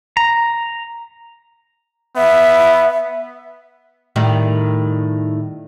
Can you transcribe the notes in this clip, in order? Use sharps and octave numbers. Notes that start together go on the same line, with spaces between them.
A#5
B3 E5
A2 D#3 G3